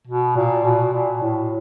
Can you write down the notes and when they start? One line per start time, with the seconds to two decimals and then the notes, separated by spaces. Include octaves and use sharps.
0.07 B2
0.36 A#2
0.65 B2
0.94 A#2
1.22 A2